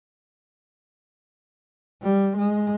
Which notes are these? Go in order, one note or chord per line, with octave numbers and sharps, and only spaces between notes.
G3
G#3